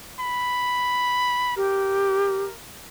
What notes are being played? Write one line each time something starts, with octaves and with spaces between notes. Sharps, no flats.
B5
G4 A#4